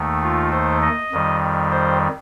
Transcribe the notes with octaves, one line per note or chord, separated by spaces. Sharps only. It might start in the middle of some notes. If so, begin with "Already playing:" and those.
Already playing: D#2 D#3 A3
F4
C5
D#5
F2 D#3 G3
C5